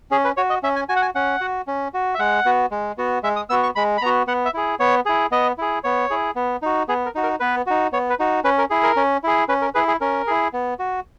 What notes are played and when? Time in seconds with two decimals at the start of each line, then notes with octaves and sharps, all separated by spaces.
0.11 C#4 G#4
0.25 B4
0.37 F#4 C#5
0.50 D#5
0.63 C#4 E5
0.76 G#5
0.89 F#4 G#5
0.96 F#5
1.02 G#5
1.15 C#4 F#5
1.41 F#4
1.67 C#4
1.94 F#4
2.14 E5
2.19 G#3 F#5
2.45 B3 F#4
2.71 G#3
2.98 B3 F#4
3.23 G#3 E5
3.36 D#6
3.50 B3 F#4 E6
3.63 C#6
3.75 G#3 B5
3.98 B5
4.02 B3 F#4 A#5
4.27 B3 F#5
4.45 E5
4.54 E4 G#4
4.80 B3 C#5
5.06 E4 G#4
5.31 B3 D#5
5.58 E4 G#4
5.84 B3 C#5
6.10 E4 G#4
6.36 B3
6.62 D#4 F#4
6.88 B3 G#4
7.06 A#4
7.15 D#4 F#4
7.23 A#4
7.40 B3 B4
7.66 D#4 F#4
7.92 B3 C#5
8.10 B4
8.19 D#4 F#4
8.44 C#4 B4
8.58 A#4
8.70 E4 G#4
8.83 A#4
8.96 C#4
9.23 E4 G#4
9.49 C#4 B4
9.62 A#4
9.74 E4 G#4 B4
9.88 G#4
10.01 C#4 A#4
10.27 E4 G#4
10.53 B3
10.79 F#4